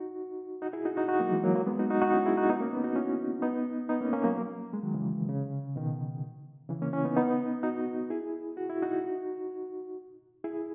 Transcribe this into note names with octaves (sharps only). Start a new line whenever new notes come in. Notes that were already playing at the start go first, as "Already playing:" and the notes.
Already playing: D#4 F#4
D#4 F#4
E4 G#4
D#4 F#4
D#4 F#4
D#4 F#4
F#3 A#3
E3 G#3
F#3 A#3
F#3 A#3
G#3 B3
D#4 F#4
D#4 F#4
D#4 F#4
C#4 E4
E4 G#4
D#4 F#4
B3 D#4
A#3 C#4
B3 D#4
D#4 F#4
C#4 E4
B3 D#4
B3 D#4
A#3 C#4
A#3 C#4
F#3 A#3
G#3
D#3 F#3
C#3 E3
C#3
B2 D#3
C#3 E3
A#3 C#4
C#4 E4
B3 D#4
B3 D#4
D#4 F#4
E4 G#4
F#4
E4
D#4 F#4
E4 G#4